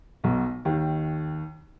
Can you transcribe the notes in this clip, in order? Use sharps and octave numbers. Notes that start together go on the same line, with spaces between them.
B1 B2
D#2 D#3